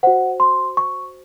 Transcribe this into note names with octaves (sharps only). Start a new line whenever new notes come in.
F#4 C5 F#5
C6
C#6